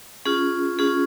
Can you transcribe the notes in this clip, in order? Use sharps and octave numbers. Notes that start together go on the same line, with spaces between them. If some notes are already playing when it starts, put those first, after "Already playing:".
C#4 F4 G#4
C#4 F4 G#4